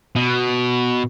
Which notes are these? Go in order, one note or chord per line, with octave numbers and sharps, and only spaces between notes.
B2